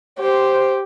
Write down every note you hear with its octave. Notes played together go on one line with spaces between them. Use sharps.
G4 C5